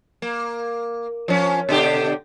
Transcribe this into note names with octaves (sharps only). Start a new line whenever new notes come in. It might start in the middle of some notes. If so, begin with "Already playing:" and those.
A#3
F3 C#4
B2 D3 G4